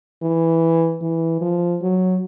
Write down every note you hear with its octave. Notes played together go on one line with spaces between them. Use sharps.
E3
E3
F3
F#3